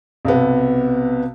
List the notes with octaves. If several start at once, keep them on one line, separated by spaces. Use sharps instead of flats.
B1 C3 B3